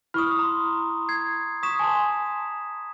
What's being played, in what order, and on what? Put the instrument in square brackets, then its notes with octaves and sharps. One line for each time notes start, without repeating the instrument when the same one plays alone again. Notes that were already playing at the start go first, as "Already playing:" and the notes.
[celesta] E4 F6 [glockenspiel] B5 C#6 D#6
[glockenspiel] A#5 C6
G#6 C7
[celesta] C#6 [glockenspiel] D#6 B6 E7
[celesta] G#5 A5 C6